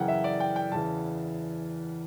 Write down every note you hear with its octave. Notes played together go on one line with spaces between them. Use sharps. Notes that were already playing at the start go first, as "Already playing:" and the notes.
Already playing: F#2 C#3 E3 F#5 G5
E5
D5
G5
G5
E2 C#3 E3 A5